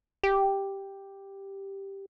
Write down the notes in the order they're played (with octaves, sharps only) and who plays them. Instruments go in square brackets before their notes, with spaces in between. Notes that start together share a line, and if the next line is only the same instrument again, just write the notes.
[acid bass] G4